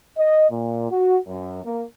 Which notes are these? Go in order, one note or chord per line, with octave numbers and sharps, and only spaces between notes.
D#5
A#2
F#4
F#2
A#3